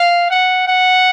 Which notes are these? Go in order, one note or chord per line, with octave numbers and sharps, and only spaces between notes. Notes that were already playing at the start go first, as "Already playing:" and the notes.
Already playing: F5
F#5
F#5